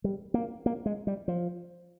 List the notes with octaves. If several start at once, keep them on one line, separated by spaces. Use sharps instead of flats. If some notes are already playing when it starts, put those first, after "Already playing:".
G3
A#3
A#3
G#3
G3
F3